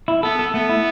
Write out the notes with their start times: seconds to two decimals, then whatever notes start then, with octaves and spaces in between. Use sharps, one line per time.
0.08 E4
0.23 B3 A4
0.39 A4
0.54 A3 B3
0.69 E4